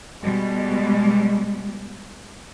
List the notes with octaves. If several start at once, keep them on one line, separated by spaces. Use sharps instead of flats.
B2 G3 G#3